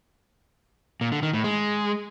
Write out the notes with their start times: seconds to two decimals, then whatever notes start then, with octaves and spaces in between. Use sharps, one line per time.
1.01 A#2
1.12 D3
1.23 D#3
1.33 A2
1.44 G#3